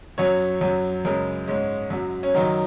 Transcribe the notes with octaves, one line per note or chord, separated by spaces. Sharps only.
F#2 F#3 C#5
F#2 F#3
F#2 C#3 G#3 A#4
G#2 G#3 C#4
F#2 F#3
C#4
F#2 D#3 F#3 D#4